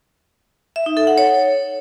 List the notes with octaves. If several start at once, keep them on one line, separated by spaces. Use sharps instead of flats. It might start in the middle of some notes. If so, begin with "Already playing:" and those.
E5
D#4
A4
F#5
C#5